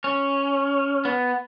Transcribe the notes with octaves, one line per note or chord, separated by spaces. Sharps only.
C#4
B3